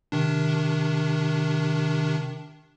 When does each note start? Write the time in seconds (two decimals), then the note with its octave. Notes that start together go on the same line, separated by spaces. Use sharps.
0.12 C3 D#3 D4